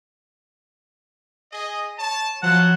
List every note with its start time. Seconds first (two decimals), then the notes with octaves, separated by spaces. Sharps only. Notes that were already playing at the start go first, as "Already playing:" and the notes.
1.51 G#4 D#5
1.98 C#5 A5
2.43 F3 F#3 F4 F#4 F#5 A5